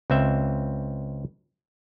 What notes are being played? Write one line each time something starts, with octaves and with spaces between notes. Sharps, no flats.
C#2 C4 E5